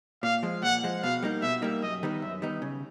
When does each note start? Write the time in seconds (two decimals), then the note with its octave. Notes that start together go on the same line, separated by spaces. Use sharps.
0.23 A#2 F5
0.43 F3 G#3
0.62 A#2 F#5
0.83 F3 G#3
1.03 B2 F5
1.23 G3 A#3 D#4
1.42 B2 E5
1.62 G3 A#3 D#4
1.82 F#2 D#5
2.03 D#3 G3 B3 D#4
2.22 F#2 E5
2.42 D#3 G3 B3 D#4
2.62 C#3